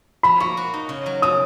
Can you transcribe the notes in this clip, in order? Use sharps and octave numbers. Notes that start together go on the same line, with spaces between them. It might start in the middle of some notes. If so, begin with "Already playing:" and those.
F3 B5
A#3 C#6
F#4
D#4
C#3
F#3
C#3 D#6